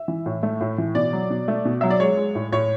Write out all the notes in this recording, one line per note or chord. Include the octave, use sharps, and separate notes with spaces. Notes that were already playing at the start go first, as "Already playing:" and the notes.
Already playing: E5
E3
A2
A3
A2
E3
B2 D5
F#3
B2
A3
B2
F#3 E5
D5
G#3 C#5
G#3
A2
A2 C#5